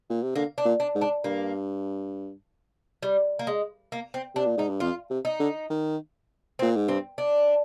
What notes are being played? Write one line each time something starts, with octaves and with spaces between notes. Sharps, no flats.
A#2
C3
D3 A#3
D4
A#2
D4
G#2
D4
G2 A#3
G3
A#3
G#3
A#3
C4
C3 D4
A#2
G#2 D#4
G2
F2 F4
C3
D#4
D3
D#3
A#2 C4
G#2
G2 C4
D4